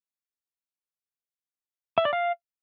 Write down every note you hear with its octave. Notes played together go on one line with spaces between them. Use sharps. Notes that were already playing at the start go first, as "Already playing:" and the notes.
E5
D5
F5